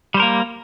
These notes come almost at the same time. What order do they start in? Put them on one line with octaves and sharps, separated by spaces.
G3 C5 A#4 A#3